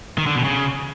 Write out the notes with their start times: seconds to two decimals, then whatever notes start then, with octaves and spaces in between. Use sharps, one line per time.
0.18 D#3
0.27 D3
0.35 B2
0.44 C#3